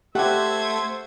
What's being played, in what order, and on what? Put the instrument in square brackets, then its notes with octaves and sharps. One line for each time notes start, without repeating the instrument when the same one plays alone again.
[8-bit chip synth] A3 G#6 [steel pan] G4 [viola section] C5 E5 [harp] F#5